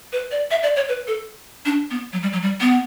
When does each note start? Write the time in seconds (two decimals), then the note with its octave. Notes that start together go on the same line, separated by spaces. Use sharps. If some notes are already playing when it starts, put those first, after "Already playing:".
0.13 B4
0.31 D5
0.51 E5
0.63 D5
0.76 C#5
0.89 B4
1.07 A4
1.65 D4
1.91 B3
2.13 F#3
2.22 G3
2.33 F#3
2.42 G3
2.61 B3